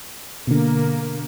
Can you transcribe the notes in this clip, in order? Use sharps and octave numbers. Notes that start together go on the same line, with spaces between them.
B2 D3 A#3